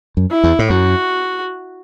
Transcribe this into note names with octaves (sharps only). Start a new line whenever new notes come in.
F#2
E4
E2
A2
F#2 F#4